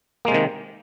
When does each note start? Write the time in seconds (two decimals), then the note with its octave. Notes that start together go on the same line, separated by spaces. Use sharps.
0.25 A#3
0.28 G#3
0.31 C3
0.34 D#3